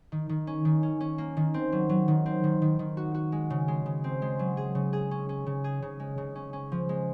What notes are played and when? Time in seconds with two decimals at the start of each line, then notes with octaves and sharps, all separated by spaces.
0.12 D#3
0.29 D#3
0.47 C#4
0.65 D#3
0.83 C#4
1.01 C#4
1.18 A#3
1.37 D#3
1.54 C4
1.72 F#3
1.89 F#3
2.08 D#3
2.26 C4
2.44 D#3
2.62 D#3
2.79 D#3
2.97 F#4
3.15 F#4
3.32 G#3
3.50 C#3
3.68 G#3
3.86 C#3
4.04 C4
4.22 G#3
4.39 F#3
4.57 G#4
4.75 C#3
4.93 G#4
5.11 C#4
5.29 C#4
5.46 C#3
5.64 G#4
5.82 C#3
6.00 G#3
6.18 C#3
6.35 C#4
6.53 C#4
6.72 F3
6.89 G#3